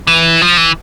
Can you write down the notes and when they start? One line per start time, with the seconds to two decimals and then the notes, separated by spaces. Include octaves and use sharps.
0.07 E3
0.42 F3
0.57 E3